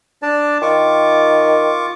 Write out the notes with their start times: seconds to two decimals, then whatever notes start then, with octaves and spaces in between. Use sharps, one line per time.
0.23 D4 D5 A5
0.62 D#3 F4 C#6 D6